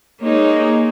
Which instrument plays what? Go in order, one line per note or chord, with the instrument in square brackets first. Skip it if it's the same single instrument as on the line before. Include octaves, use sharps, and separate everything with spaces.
[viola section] G#3 D#4 G#4 C#5 [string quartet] A#3